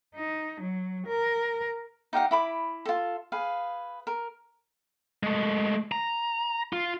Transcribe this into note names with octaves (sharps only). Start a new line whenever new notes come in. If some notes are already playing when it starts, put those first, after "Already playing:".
D#4
F#3
A#4
D#4 G4 F5 F#5
E4 B5 D6
F4 A4
G#4 B4 F5
A#4
G#3 A3
A#5
F4